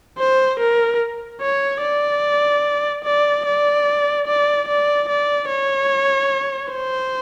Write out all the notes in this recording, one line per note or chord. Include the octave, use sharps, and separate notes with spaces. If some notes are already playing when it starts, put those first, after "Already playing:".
C5
A#4
C#5
D5
D5
D5
D5
D5
D5
C#5
C5